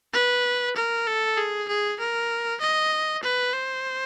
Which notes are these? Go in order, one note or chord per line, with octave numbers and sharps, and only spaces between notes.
B4
A#4
A4
G#4
G#4
A#4
D#5
B4
C5